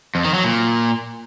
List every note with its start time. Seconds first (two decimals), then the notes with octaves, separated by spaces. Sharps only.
0.15 F2
0.24 D#3
0.34 F#3
0.44 A#2